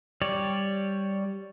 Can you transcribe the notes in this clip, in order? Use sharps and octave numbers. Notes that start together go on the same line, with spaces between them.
G3 C#5 D5